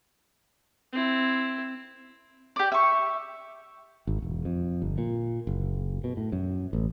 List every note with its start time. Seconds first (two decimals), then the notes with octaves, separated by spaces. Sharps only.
0.92 C4 E4
2.56 G4 D5
2.72 E5 C#6
4.07 G#1
4.22 E1
4.45 F2
4.82 G1
4.98 A#2
5.47 F#1
6.04 B2
6.17 A2
6.32 F#2
6.73 A1